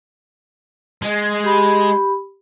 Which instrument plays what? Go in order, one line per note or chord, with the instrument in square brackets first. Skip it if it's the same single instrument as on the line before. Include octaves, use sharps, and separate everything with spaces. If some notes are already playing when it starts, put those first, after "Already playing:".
[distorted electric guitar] G#3
[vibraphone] G4 B5